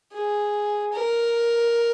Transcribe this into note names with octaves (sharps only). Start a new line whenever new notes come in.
G#4
A#4